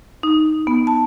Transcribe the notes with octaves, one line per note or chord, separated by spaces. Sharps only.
D#4
B3
A5